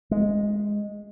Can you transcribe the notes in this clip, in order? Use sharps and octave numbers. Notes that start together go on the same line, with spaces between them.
G#3